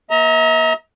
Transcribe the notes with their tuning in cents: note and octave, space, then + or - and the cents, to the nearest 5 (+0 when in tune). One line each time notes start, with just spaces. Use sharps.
A#3 +40 E5 -45 A#5 +0